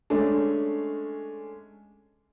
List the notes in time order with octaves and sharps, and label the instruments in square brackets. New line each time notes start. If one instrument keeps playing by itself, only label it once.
[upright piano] G#3 A3 C#4 D4